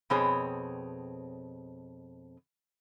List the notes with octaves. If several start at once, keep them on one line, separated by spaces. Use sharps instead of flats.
F2 B2 C4 G#4 C#5